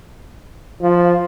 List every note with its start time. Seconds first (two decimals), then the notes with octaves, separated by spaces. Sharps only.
0.81 F3